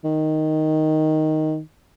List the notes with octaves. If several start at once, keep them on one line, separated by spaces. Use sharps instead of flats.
D#3